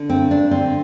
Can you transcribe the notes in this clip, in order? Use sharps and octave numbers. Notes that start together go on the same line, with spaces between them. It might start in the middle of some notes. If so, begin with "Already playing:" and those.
Already playing: D3
G2 C4
D4
D3 C4